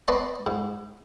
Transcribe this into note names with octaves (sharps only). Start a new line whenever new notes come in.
B3 B4 D5 D#5 A5 C6
G#2